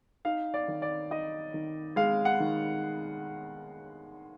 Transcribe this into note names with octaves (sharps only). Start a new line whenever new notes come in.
D#4 F5
D5
D#3
D5
D#4 D#5
D#3
G#3 F5
F#5
D#3